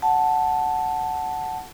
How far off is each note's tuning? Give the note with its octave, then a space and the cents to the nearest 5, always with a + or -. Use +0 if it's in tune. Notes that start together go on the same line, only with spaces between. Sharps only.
F#5 +0 A5 +0